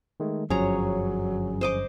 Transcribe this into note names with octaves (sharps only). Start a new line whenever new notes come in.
D#3 G#3 A3
G1 F#2 F3 F#3 C#4 G#4 C#5 A#5
C5 D#5 D6